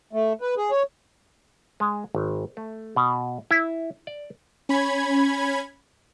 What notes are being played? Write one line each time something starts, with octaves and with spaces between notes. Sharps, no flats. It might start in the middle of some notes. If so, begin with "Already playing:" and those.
A3
B4
G#4
C#5
G#3
G#1
A3
B2
E4
D5
C#4 B5 G#6